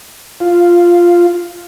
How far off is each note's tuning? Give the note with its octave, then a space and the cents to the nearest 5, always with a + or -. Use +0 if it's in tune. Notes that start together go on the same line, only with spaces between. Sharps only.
F4 +0